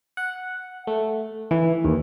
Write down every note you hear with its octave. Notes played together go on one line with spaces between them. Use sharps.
F#5
A3
E3
D#2